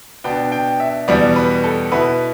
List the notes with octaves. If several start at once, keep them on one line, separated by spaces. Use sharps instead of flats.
B2 B3 D4 G5
G5
E5
E2 B2 G3 B3 D5
B4
A4
B2 B3 E4 B4